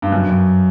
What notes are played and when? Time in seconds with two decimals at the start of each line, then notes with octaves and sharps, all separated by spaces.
0.02 G2
0.12 F#2